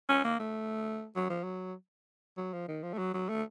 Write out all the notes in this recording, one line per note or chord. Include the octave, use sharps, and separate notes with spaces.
C#4
A#3
A3
F#3
F3
F#3
F#3
F3
D#3
F3
A3
F#3
F#3
A3